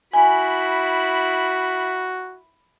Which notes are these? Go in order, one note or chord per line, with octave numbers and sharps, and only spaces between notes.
E4 F#4 G#5 B5